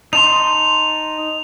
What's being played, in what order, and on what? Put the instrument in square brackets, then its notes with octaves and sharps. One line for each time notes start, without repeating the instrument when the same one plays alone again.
[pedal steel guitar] D#4 A5 C6 [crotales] F7